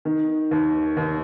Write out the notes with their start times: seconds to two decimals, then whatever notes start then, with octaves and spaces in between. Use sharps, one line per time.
0.05 D#3
0.51 D#2
0.97 D#2